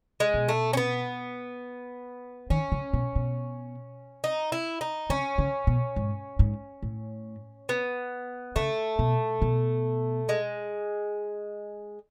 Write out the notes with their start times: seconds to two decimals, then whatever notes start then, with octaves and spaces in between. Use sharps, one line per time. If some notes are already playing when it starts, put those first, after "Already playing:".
0.20 G#3
0.34 B2
0.48 A3
0.73 C#4
0.77 B3
2.50 D#3 C#4
2.72 C#3
2.93 B2
3.16 B2
4.24 D#4
4.52 E4
4.81 D#4
5.10 C#3 C#4
5.38 C#3
5.67 B2
5.96 G#2
6.39 G#2
6.83 A2
7.69 B3
8.56 C#3 A3
8.99 B2
9.42 B2
10.29 G#3